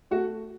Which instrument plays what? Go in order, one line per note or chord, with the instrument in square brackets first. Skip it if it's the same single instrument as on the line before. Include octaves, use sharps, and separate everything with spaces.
[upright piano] A3 F#4